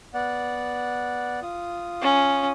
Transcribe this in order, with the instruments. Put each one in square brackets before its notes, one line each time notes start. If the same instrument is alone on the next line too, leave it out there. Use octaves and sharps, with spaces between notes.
[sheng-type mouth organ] B3 D5 F#5
F4 D#6
[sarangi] C#4